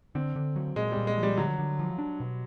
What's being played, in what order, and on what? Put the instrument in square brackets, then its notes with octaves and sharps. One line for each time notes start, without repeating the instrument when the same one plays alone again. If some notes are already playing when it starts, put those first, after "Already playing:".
[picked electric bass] D3 [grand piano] C4
[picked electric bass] D3
F#3
[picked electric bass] A#2 [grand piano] G#3
[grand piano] G3
[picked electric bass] A#2
[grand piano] G#3
[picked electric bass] F3
[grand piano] G3
[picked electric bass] D3 [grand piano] F#3
[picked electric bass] D3
F3
D4
B2